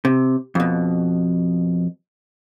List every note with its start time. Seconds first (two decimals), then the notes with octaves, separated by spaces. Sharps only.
0.05 C3
0.55 F2 B2